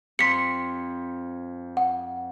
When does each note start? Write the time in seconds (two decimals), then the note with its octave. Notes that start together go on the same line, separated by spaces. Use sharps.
0.19 F2 C6 B6 C#7
1.77 F#5